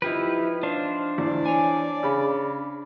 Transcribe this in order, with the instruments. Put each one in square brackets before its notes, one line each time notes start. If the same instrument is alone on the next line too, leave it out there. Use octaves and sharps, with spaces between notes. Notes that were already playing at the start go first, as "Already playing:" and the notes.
[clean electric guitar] F3 D#4 [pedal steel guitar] E4 G4 B4
[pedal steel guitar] D4 C5 F5
[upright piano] E2 [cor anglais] D5
[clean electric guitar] C#5 G#5
[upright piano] C#3 B5